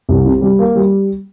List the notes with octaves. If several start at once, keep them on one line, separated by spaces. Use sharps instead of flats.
C2
C3
G3
A#3
G3